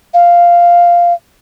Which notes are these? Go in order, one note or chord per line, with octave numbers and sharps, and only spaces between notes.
F5